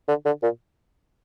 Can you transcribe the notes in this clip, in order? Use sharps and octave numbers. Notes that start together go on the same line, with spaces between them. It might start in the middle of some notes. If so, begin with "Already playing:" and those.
D3
D3
A#2